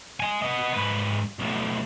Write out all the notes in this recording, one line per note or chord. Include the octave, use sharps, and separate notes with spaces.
D#5 G#5
B3 D#5
G#2 B4
B1 A2